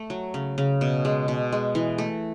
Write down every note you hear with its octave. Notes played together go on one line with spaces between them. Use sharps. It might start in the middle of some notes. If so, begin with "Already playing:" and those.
Already playing: A3
F#3
C#3
C#3
B2
G#3
B2
G#3
E3
A3